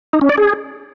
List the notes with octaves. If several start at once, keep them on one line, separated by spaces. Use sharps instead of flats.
D#4
C#4
D5
G#4